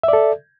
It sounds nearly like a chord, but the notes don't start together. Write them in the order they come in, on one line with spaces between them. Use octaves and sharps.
E5 D5 A4